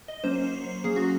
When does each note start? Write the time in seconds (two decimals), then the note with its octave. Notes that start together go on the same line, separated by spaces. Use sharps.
0.08 D#5
0.24 F#3 A#3 C#4 C5
0.84 F#3 A#3 C#4 G#4
0.96 F#4